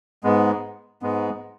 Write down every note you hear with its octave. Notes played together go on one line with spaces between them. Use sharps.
G#2 G#3 B3
G#2 G#3 B3